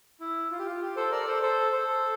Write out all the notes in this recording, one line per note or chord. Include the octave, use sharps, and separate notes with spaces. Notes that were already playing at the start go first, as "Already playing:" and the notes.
E4
F4
G4
F4
G4
A4 C5
A#4 D5
A4 C5
A4 C5
A4 C5